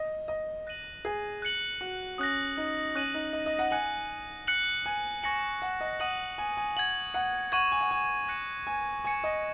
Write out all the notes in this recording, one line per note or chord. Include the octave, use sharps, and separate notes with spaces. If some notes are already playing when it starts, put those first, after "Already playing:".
Already playing: D#5
D#5
F#6 A#6 D#7 F#7
G#4
F#6 C#7 F#7
F#4
C#4 D#6 F#6 A#6
D#4
C#4 D#6 F#6 D#7 F#7
D#4
D#5
D#5
F#5
G#5 F#6 C#7 F#7
F#6 C#7 F#7
G#5
G#5 C#6 A#6 C#7 F#7
F#5
D#5
F#5 D#6 F#6 D#7 F#7
G#5
G#5
F#5 G#6 F#7
F#5
F#5 C#6 G#6 D#7 F#7
G#5
F#5
G#5
F#6 A#6 C#7 F#7
G#5
G#5 C#6 G#6 C#7
D#5